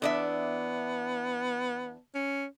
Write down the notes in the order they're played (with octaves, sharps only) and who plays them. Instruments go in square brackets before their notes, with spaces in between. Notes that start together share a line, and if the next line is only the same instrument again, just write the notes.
[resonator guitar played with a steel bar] E2 D4 E5 [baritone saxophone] B3
[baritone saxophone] C#4